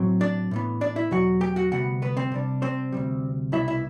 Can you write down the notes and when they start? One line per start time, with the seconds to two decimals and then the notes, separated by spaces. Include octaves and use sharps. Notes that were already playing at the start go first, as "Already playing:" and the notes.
Already playing: A2 F#3 C4
0.21 D4 D5
0.51 A2 E3 B3
0.81 D4 D5
0.96 E4 E5
1.11 E2 B2 F#3 F#4 F#5
1.41 G4 G5
1.56 F#4 F#5
1.71 D2 C3 G3 B3 F#4 F#5
2.02 B3 B4
2.17 C4 C5
2.32 C3 G3 D4
2.62 C4 C5
2.92 D2 C3 G3
3.52 C2 B2 G3 B3 E4 E5
3.68 E4 E5